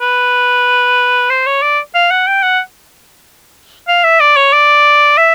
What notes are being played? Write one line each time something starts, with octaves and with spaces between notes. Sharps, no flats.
B4
C5
C#5
D5
F5
F#5
G5
F#5
F5
E5
D5
C#5
D5
E5